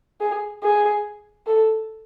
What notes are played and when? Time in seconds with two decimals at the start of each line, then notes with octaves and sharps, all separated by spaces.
0.21 G#4
0.63 G#4
1.47 A4